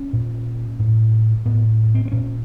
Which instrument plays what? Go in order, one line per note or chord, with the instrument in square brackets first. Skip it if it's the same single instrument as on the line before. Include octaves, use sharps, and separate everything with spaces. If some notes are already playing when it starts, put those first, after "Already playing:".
Already playing: [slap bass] C#4
A#2
A2
A2 B3
C4
C4
A#2 C#4